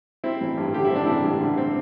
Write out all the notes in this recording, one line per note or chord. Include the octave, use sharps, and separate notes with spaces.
C4 E4
A1
G2
D3 G4
E4
C4
D4
A1 E4
G2
D3
C4